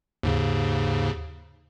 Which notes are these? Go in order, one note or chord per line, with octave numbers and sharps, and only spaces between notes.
D#2 G#2 C#3